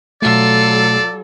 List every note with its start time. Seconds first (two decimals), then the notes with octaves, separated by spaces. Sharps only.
0.22 B2 F#3 A3 F4 A4 D5 E6